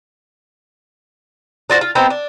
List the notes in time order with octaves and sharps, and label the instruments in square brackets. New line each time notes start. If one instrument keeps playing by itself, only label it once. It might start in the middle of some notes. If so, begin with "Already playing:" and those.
[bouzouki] D4 F4 F#4 C5
F4
B3 C4 D#4 G4
D4